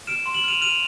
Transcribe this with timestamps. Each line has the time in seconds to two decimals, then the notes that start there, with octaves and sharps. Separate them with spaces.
0.07 F6 D7 E7
0.26 C6
0.34 E7 F#7
0.44 F6 D#7 F7
0.61 F6 D#7 F7